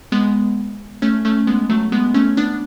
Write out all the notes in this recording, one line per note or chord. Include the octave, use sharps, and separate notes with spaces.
G#3 B3
A3 C#4
A3 C#4
G#3 B3
F#3 A3
G#3 B3
A3 C#4
B3 D4